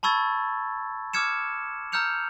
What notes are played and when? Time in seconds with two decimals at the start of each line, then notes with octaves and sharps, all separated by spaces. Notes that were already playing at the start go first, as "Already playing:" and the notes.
0.03 A5 B5 C#6 E6 G#6 A6
1.14 D6 E6 F6 G#6 C#7 E7
1.92 A#5 E6 F6 G6 C#7 F7